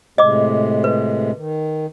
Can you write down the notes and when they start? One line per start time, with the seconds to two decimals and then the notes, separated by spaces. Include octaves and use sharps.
0.18 A2 C3 G#3 D#5 D6
0.84 B4
1.36 D#3